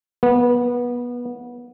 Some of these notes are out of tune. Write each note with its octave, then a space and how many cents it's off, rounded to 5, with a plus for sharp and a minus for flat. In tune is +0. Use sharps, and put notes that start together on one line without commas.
B3 -20